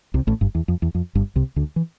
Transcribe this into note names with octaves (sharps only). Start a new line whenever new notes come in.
C2 C3
A1 A2
G1 G2
E2
F2
E2
F2
G1 G2
C2 C3
D2 D3
E3